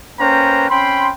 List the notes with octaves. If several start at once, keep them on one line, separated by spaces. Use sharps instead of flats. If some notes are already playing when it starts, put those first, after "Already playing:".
A#3 C#4 B4 C5 G5 A#5
C4 C#4 G5 B5 C6